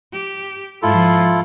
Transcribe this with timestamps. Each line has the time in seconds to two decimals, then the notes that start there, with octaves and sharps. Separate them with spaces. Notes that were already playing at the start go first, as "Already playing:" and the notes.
0.13 G4
0.82 G#2 F3 E4 F4 A4